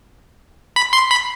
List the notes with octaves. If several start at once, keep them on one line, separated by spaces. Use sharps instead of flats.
B5
C6
B5